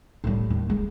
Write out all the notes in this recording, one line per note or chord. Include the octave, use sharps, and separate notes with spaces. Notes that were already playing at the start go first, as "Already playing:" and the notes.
A2 G3
D#2
G#3